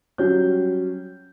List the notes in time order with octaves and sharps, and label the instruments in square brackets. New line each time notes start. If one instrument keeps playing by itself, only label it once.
[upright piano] F#3 G3 C#4 G6